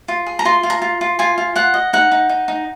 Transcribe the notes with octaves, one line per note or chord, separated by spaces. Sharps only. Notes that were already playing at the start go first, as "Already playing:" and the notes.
F4
G#4
A#5
F4 C6
F4
A#5
F4
F4
F4 G#5
F4
F4 F#5
D#5
D#4 F#5
D#4
D#4
D#4